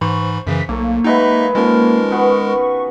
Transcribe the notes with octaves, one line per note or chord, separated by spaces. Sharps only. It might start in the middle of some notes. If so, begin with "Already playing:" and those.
G#2 E3 C5 B5 C#6
F#2 C#3 E3 B6
B1 A3 A#3
F#3 G#3 D#4 B4 D#5 E5
D#3 F3 G#3 C#4 A#4
B3 F#4 C#6